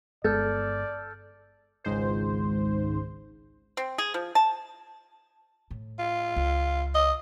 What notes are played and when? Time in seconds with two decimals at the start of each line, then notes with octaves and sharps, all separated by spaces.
0.24 G1 G#3 B3 A4 D5 F6 G6 A6
1.84 G#1 C#2 G#2 C5
3.77 C4
3.98 G#4
4.14 F3
4.35 A5
5.71 A2
5.99 F4
6.36 C#2
6.95 D#5